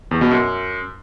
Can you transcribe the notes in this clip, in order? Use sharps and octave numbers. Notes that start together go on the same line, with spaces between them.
E2
B2
F#2